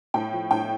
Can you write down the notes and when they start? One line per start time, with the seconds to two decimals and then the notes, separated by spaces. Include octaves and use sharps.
0.14 A2 G5
0.33 F3
0.51 A2 G5